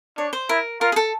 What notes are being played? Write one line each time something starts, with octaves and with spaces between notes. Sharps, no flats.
D4 C#5
C5
E4 A#4
F4 A#4
G#4
A4